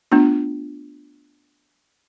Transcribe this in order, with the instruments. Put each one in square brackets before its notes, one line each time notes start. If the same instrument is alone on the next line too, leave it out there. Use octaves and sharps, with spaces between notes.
[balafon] A3 B3 D4 F4